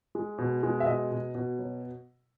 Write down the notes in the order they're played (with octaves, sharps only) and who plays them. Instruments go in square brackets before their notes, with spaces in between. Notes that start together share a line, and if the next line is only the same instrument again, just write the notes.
[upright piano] G#3
B2
G#3
E5
B2 D#5
B2
B2
F#3